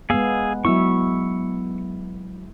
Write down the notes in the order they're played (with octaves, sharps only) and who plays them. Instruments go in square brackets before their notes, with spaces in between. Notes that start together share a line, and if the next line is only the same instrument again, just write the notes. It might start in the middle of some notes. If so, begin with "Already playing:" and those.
[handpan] G#3 B3 [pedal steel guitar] G#4 F5 E6
[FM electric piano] F#3 B3 [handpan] E4 [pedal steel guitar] C#6 E6